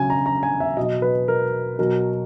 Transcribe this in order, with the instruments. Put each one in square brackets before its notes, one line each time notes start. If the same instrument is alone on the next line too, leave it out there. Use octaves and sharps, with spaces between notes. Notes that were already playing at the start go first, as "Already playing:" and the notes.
Already playing: [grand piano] C#3 F#3 G#5
A#5
A#5
G#5
E5
B2 D#5
F#3
B4
A#4
B2 F#3 A#4